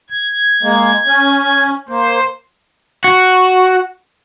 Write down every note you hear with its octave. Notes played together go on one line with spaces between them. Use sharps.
G#6
G#3 A#3
C#4
A#3 C5
F#4